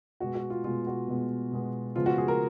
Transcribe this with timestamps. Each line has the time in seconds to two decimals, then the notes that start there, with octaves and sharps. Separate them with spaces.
0.20 B2 G#3 B3 F#4
0.35 F#4
0.50 F4
0.64 B2 G#3 B3 F4
0.87 F#4
1.08 B2 G#3 B3
1.51 B2 G#3 B3
1.96 C#3 F3 G#3 B3 F4
2.06 F#4
2.18 G#4
2.28 A#4